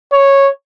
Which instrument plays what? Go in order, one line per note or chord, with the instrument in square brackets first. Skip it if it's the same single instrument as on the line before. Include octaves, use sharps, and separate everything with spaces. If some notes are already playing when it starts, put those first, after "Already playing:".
[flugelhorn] C#5